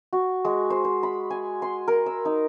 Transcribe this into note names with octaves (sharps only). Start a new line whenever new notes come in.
F#4
G#3
C5
C5
B5
G#5
C6
A#4
E6
D#4